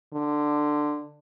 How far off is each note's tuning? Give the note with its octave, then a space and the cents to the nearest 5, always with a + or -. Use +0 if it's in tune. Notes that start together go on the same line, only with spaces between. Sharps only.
D3 +15